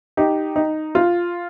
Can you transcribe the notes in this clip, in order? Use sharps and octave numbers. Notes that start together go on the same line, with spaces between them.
D#4 G4
D#4
F4